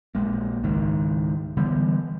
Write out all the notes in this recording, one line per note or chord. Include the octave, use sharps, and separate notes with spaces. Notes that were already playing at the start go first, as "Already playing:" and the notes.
A#1 G#3 A#3
C#2 G#2 D#3
D3 E3 G3 B3